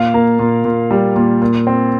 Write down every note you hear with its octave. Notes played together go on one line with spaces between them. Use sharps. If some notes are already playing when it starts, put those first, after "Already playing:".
Already playing: A#2 F5
A#3
A#2
A#2
G3
A#2
A#2
C4